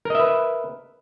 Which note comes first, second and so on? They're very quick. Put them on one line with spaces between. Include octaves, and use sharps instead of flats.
A#4 D#5 E5 B4